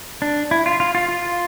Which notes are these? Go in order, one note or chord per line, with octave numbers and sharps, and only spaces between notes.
D4
E4
F4
F4
F4
F4